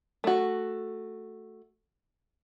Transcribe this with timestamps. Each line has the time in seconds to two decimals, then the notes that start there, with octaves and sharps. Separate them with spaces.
0.24 A3 F#4